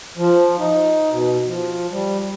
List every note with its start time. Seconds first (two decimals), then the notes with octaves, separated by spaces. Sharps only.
0.17 F3
0.58 D#4
1.11 B2
1.47 F3
1.91 G3